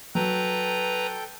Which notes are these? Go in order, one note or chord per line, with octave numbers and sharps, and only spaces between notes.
F#3 A4 B4 G5 A#5